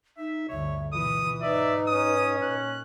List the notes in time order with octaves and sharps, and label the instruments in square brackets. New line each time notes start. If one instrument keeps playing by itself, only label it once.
[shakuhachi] D#4 [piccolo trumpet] E5
[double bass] G1 D2 [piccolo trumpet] C#5 [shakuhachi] E5
[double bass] B2 E3 [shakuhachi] F4 [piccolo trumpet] D#6
[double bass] G#2 D#4 [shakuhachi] B4 [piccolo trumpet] D5 [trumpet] E5
[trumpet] C#4 [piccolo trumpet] D#6
[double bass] A#2 [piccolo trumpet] F#6